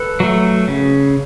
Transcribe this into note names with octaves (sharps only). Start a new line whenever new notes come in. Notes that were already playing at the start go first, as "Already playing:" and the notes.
Already playing: A4 B4
F#3 A3
C#3